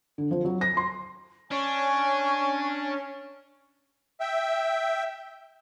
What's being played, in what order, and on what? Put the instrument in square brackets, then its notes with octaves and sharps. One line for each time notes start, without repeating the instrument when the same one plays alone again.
[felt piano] D3
F3
F#3
A#6
C6
[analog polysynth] C#4 [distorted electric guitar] D4 [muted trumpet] G#5 [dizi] C#6
[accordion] E5 G5